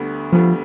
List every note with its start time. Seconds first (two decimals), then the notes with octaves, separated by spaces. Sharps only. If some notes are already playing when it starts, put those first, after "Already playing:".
Already playing: D2 D3 G3 B3
0.32 D2 D3 F3 G3 B3